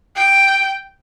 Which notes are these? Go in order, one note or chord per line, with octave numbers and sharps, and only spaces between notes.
G5